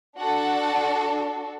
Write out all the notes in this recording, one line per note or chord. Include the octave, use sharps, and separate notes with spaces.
D4 F#4 A4 F#5